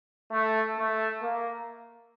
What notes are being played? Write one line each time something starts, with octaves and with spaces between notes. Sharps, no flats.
A3
A3
A#3